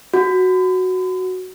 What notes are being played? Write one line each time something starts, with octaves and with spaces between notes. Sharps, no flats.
F#4